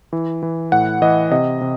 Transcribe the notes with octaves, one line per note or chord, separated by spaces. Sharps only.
E3
E3
A2 F#5
E3 D#5
C3 D#5
C3